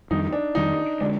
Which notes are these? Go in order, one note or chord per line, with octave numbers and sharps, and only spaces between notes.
F2 D#3 G3 D4 D#4
D4
F2 D#3 G3 D4 D#4
D3 G#3 D4